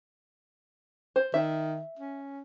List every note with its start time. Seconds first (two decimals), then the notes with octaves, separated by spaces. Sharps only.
1.16 C5
1.34 D#3 E5
1.99 C#4